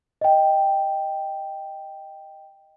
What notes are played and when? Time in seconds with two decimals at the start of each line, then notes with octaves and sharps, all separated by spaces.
0.21 D#5 G5